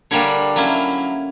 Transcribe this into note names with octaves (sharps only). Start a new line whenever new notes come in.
D3 G3 A#3 D4 C#5
F#3 A#3 C#4 E4